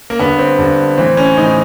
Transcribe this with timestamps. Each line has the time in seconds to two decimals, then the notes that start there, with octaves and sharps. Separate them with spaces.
0.10 A#3
0.19 G2 D3 B3
0.39 C4
0.59 G2 D3
0.98 A2 E3 C4
1.17 C#4
1.37 A2 E3 D#4